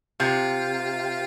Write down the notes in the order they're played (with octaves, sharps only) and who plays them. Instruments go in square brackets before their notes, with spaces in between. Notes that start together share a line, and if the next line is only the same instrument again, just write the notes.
[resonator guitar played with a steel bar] C3 [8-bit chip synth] F4